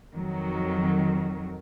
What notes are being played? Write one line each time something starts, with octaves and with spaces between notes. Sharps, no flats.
F2 D#3 F#3